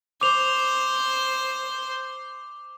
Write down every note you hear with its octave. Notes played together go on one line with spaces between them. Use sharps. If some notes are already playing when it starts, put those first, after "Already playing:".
C5 D6 F7